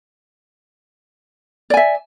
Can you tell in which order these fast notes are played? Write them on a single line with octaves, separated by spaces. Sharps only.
D5 G#5 E5